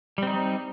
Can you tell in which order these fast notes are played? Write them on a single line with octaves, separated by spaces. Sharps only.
G3 C4 D#4